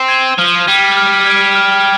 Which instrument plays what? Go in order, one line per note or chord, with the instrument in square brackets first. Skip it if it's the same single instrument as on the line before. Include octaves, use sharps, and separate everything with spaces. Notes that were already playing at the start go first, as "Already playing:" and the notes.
Already playing: [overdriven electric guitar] C4
[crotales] G#6 D#7 G7
[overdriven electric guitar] F3 [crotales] F6
[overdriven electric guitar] G3 [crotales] G#6 D#7 G7
[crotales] F6
G#6 D7
F6